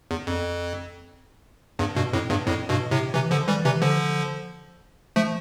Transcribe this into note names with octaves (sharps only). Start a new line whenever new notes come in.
E2
F2
E2 G2
G2 B2
F2 A2
E2 G2
F2 A2
G2 B2
A2 C3
C3 E3
D3 F3
E3 G3
C3 E3
D3 F3
F3 A3